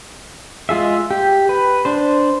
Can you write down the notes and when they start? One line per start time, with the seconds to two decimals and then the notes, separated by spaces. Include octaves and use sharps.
0.69 G#3 F4 G#4 E5
1.11 G4
1.49 B4
1.85 D4 C5